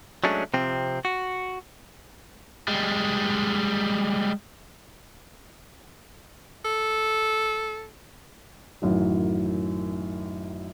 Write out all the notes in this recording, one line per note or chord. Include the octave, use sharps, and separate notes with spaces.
F#3 G#3 A3 C#4 D4
C3 F3 C4
F#4
G3 G#3
A4
A1 F#2 D#3 F#3